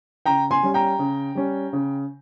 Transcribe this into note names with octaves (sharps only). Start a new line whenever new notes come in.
C#3 G5 A#5
G#5 C6
G3 C#4
G5 A#5
C#3
G3 C#4
C#3